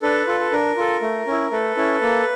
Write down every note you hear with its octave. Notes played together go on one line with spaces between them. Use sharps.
D4 A4 B4
F4 A4
A4
D4 A#4
F4 A4
A3
C#4 E4
A3 A4 B4
C#4 E4
A#3